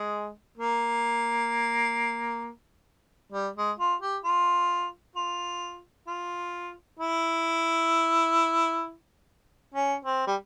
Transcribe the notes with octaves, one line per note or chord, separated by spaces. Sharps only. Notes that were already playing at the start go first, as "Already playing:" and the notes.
Already playing: G#3
A#3
G3
G#3
F4
G4
F4
F4
F4
E4
C#4
C4
G3